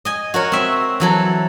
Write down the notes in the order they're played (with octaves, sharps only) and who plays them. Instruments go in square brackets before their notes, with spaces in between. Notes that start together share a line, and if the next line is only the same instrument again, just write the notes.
[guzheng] D#5 G#5
F#4 A#4 C#5
C4 E5
E3 F#3 A4